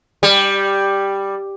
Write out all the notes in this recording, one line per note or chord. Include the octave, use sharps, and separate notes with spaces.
G3